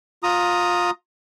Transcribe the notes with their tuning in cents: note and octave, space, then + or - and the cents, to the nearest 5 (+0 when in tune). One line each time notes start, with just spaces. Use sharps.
F4 +20 A#5 +0 D#6 +0